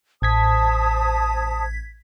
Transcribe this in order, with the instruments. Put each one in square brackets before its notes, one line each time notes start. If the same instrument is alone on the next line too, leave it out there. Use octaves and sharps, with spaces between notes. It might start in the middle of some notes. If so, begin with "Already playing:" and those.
[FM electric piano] A1 G#6 B6 [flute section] C5 A5 D#6